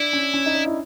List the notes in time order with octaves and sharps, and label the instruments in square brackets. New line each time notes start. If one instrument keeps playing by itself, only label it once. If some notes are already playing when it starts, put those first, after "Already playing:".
Already playing: [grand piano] D4 [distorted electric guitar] E4
[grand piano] C#4
C#4
D#4
D4
E4